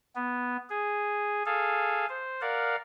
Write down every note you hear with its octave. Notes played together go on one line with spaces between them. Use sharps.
B3
G#4
G#4 A4 F5
C5
A#4 D5 F5 F#5